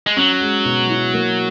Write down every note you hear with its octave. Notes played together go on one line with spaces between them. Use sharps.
G#3
F#3 C#4
G#3
B2
E4
A#3